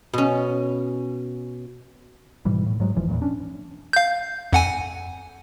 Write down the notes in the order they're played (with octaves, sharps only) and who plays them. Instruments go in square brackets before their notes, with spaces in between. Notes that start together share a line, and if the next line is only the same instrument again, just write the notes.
[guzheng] B2 C#4
[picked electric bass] G#2 B2 E3 G3
A2
G#2 F#3 G#3
F1 E3 F3
E2 G2 A#2
C#4 D4
[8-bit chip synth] F5 G6
F2 F#5 G#5